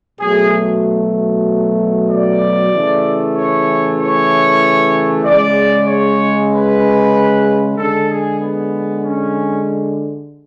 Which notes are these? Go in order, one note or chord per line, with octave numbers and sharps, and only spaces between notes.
B2 F#3 A3 G#4
D5
C#3 E3 A3
C#5
C#5
C#3 G#3 D5
C#5
B4
D3 G#3 A4
G#4
B3
C#4